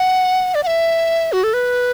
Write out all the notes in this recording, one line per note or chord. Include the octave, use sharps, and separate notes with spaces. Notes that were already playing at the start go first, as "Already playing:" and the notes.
Already playing: F#5
D5
F#5
E5
F#4
A4
B4